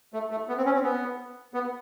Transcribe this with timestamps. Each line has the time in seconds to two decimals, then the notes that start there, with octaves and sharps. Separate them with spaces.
0.13 A3
0.31 A3
0.49 B3
0.57 C4
0.66 C#4
0.74 C4
0.83 B3
1.54 B3